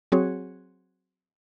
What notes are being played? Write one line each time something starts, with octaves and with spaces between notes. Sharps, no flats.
F#3 C4 F#4 G#4 C#5